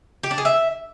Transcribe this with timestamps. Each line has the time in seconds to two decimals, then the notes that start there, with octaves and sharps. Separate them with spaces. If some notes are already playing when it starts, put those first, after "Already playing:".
0.23 G4
0.31 D4
0.38 G#4
0.45 E5